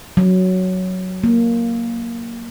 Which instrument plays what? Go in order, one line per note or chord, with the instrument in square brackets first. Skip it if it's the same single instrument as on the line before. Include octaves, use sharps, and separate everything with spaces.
[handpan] F#3
A#3